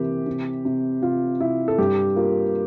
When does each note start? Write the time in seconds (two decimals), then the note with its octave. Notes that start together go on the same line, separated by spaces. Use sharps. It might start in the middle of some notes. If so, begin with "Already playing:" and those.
Already playing: C3 E3 A#3 G4
0.26 C3
0.65 C3
1.02 C3 F4
1.40 C3 E4
1.68 A4
1.78 G2 G4
2.16 A#3 F4